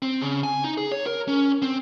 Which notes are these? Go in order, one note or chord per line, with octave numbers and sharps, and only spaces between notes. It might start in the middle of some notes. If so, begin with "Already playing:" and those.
C4
C#3
G#5
D#4
G#4
C#5
A#4
C#4
C4